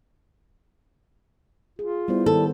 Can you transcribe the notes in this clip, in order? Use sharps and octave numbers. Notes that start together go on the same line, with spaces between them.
F4 G#4
G3 B3 E4 C5
D#3 G3 A4